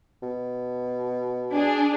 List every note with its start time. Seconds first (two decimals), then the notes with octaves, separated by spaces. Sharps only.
0.23 B2
1.54 D4 G#4